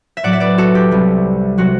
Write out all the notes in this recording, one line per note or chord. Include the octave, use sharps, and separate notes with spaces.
E5
A2 F#3 D5 F#5
E5
B4 D5
F#4 A4
G4
C2 C3 G3
C3 F#3 F#4